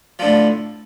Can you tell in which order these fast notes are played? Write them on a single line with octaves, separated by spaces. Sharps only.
F3 D3 A2